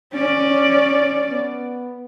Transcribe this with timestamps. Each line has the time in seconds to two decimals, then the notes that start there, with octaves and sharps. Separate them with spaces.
0.14 C#4 D5
0.49 C#5
1.31 B3